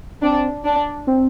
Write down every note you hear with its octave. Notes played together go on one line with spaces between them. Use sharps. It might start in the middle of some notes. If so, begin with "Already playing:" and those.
C4 D4
D4
C4